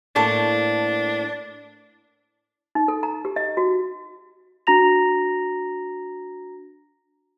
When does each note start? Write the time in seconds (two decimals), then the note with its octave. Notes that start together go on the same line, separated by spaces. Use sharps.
0.16 A2 A#3 C4 D4 A4 A5 C#6
2.75 D#4
2.88 A4
3.03 A#5
3.25 G4
3.36 D#5
3.57 F#4
4.67 D4 F#4 A#5 A#6 F7